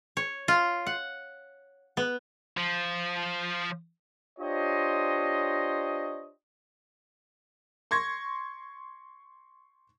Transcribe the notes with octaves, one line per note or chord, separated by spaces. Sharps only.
C#5
F4
F#5
B3
F3
D4 F4 G4 C5 C#5 D#5
C6 C#6 G#6 A#6